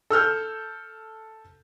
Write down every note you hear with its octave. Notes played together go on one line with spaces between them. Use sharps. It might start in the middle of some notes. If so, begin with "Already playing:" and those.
A4 E6 F6 G6